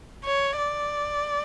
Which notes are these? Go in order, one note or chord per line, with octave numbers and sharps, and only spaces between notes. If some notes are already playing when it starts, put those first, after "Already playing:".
C#5
D5